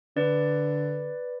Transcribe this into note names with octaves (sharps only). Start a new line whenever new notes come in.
D3 B4 D5